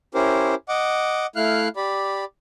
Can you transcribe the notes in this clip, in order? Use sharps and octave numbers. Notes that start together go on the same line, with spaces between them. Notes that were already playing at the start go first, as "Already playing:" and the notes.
C#4 E4 G4 A#4 C5
D#5 F#5 D6
A3 E4 F5 F6 F#6
G4 D5 B5